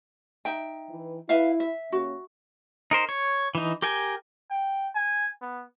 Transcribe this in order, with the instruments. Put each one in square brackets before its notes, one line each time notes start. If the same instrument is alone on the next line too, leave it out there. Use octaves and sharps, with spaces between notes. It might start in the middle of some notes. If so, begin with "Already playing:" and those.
[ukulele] D#4 E5 G5
[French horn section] E3 B4
[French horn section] E4 [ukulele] B4 E5 F5
[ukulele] E5
[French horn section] C#3 A#3 C#4 [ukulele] F#4
[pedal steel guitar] D#4 A#4 C5
C#5
E3 D#4
G4 A#4 G5 G#5
[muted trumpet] G5
G#5
B3